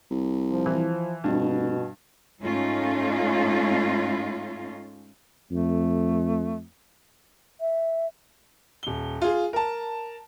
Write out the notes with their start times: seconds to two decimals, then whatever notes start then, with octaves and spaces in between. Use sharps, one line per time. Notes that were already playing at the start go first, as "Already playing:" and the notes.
0.11 C2
0.51 F3
0.66 E3
1.24 F1 G2 B2
2.43 G#2 A3 C#4 D#4 F4
5.51 F2 A3
7.61 E5
8.83 D#1 G7
9.22 F4 G#4
9.53 A#4 A5